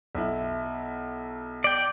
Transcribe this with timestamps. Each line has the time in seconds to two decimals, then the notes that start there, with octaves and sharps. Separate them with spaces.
0.15 B1 E4
1.64 D5 G5